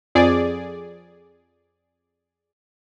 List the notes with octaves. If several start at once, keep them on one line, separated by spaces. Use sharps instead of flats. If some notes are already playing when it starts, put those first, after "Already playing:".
F2 G#4 D5